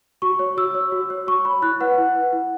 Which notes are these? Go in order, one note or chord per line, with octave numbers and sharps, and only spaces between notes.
F#4 C#6
C#5
F#4 E6
C#5
F#4
C#5
F#4 C#6
C#5 B5
E4 F#6
B4 F#5
E4
B4
E4